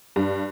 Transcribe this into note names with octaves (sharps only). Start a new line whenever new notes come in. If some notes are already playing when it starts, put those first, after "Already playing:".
G2